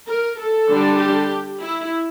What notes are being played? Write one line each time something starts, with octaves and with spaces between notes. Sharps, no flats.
A#4
A4
D3 G3 D4
G4
E4